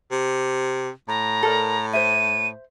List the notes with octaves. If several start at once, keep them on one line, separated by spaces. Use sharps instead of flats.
C3
A2 A#5
A4 A#4 D5
C5 E5 D#7